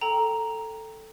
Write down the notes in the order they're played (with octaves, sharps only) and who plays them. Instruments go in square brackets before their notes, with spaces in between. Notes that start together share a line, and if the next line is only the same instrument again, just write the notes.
[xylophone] A4 G5 A#5